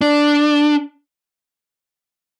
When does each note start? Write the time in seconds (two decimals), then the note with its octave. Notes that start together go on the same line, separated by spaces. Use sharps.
0.01 D4